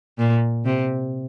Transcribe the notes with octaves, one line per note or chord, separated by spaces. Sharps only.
A#2
C3